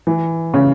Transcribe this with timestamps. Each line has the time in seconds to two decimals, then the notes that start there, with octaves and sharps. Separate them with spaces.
0.07 E3
0.54 C#3